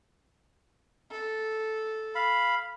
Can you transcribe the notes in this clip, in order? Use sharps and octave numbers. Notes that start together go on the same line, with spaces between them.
A4
F5 B5